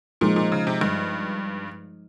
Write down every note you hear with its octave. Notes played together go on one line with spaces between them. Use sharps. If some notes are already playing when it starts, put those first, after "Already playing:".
A#2 F3 G#3 D#4
A#2
C#3
C3
G2